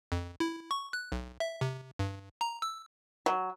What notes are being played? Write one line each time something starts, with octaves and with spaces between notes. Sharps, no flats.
F2
E4
C#6
F#6
B1
E5
C3
G2
A#5
E6
F#3